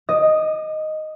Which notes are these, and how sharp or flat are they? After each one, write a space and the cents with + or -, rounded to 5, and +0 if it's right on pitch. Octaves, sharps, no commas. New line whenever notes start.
D#5 +0 D6 +45